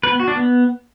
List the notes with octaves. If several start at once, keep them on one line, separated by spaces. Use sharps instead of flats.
B4
B3
F#4
D4
B3